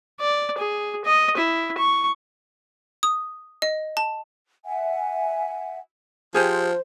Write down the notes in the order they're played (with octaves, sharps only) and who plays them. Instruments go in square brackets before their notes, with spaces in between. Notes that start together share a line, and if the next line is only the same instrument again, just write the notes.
[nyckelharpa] D5
G#4
D#5
E4
C#6
[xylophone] D#6
D#5
A5
[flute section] E5 F#5 G#5
[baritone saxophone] F3 [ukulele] G4 G#4 [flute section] C5